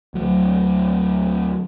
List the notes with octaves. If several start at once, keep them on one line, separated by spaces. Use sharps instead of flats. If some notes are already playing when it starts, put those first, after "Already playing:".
D2 F#3